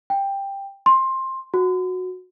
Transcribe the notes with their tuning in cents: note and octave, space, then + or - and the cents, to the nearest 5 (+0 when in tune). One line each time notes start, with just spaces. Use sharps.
G5 +10
C6 +15
F#4 -10